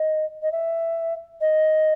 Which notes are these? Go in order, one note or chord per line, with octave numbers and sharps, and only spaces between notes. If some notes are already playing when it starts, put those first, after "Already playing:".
Already playing: D#5
D#5
E5
D#5